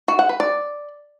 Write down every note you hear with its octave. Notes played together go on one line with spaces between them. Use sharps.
F#4
F#5
B4
D5